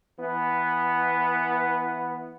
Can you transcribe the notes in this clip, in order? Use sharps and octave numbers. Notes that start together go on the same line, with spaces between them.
E3 B3